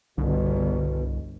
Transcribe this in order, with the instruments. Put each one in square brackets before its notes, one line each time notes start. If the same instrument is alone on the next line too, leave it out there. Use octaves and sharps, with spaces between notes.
[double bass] G1 [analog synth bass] C2 [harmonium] B2 [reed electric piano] D3